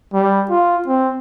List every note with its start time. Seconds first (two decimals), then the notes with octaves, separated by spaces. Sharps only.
0.14 G3
0.50 F4
0.87 C4